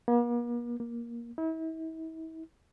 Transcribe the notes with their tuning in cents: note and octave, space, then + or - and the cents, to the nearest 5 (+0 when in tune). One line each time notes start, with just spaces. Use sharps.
A#3 +45
A#3 +15
E4 -40